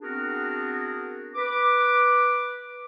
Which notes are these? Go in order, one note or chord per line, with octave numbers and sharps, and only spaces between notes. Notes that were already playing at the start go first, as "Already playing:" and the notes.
B3 C4 D4 F#4 G#4 A#4
B4 D6